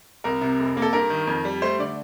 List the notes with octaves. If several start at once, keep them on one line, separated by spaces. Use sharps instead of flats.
C2 A#4
C3
F1
A#3
A4
G2 A#4
D#3
F2
G3
A3 C5
D3 D5